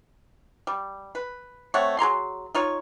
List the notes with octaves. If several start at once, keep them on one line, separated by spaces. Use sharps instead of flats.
G3
B4
A3 C4 C#5 F#5
F#3 G#4 A#5 C6
D#4 F4 C#5